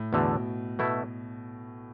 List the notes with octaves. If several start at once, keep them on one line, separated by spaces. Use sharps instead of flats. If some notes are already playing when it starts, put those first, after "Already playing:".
Already playing: A2
E2 B2 D3 A3
B2 A3 E4